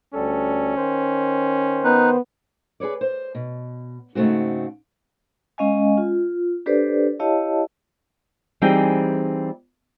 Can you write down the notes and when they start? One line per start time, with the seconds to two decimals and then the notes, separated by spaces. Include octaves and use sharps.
0.14 D2 G3 C#4 A4
0.77 D#3 C5
1.84 B3 D#4 B4
2.80 G#4 B4 C#5 D5
3.01 C5
3.35 B2
4.15 G#2 C#3 A3 C4 F#4
5.58 G#3 C#4 D#5 F5 G#5
5.98 F4
6.66 D4 G4 A4 B4 C5 D5
7.20 E4 G4 C#5 D#5 F5 A5
8.62 E3 G3 C4 D#4 G#4 G5